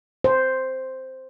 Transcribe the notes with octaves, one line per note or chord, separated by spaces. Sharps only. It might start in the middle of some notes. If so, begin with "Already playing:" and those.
C5